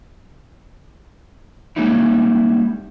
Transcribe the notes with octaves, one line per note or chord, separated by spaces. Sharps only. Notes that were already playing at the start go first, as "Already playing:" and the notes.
G3 G#3 A#3 C#4 D#4 E4